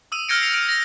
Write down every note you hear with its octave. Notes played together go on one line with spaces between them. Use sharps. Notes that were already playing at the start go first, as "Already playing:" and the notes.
D#6 E6 D#7
F6 G6 G#6 A#6 C#7 D7
C7 C#7 F7
D7 D#7
A#6